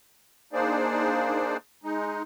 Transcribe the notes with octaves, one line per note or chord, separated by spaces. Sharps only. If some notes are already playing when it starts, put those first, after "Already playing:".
A#3 D4 D#4 G#4 C5 D5
G#3 D#4